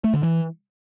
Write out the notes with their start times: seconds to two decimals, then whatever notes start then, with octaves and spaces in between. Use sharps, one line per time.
0.04 A3
0.14 D3
0.23 E3